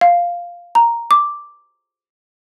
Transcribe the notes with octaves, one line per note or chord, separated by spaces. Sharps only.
F5
A#5
D6